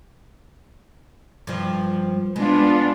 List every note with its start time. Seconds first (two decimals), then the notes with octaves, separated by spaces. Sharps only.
1.47 G2 F3
2.36 G#3 B3 D4 F4